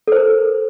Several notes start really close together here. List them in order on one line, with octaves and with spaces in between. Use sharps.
A4 C5 A#4